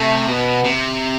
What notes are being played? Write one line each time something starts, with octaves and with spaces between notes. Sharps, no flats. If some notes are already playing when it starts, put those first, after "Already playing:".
Already playing: C3 A3
B2 B3
C3